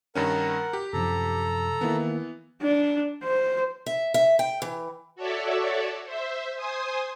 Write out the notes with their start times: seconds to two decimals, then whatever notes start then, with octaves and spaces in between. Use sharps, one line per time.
0.15 G2 D#3 C#4 A#4 F#5
0.73 G4
0.93 F#2 C3 F3 A4 A#5
1.81 D#3 E3 A#3 B3 E4
2.62 D4
3.24 C5
3.86 E5
4.14 E5
4.39 G5
4.62 E3
5.16 F#4 A4 C#5 D5 E5
6.05 C5 E5
6.56 C5 G#5 C6 D#6